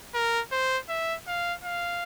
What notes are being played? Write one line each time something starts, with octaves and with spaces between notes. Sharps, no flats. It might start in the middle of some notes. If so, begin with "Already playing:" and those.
A#4
C5
E5
F5
F5